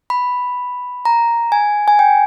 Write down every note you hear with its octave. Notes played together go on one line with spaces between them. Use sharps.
B5
A#5
G#5
G#5
G5